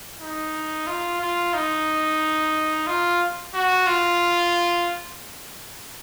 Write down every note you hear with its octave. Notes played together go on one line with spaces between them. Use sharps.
D#4
F4
F4
D#4
F4
F#4
F4